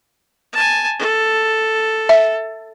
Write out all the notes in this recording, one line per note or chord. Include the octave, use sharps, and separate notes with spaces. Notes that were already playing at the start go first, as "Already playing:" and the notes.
G#5 A5
A4
E5